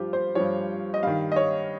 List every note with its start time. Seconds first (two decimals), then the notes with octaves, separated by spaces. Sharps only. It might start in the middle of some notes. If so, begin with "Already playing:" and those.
Already playing: G2 F3 F4 G4
0.13 C5
0.35 G2 F3 C#5
0.94 D#5
1.03 G2 D#3 F5
1.32 D#5
1.36 C#5